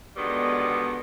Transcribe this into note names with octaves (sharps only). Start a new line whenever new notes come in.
B2 D3 D#3 G3 G#3 B3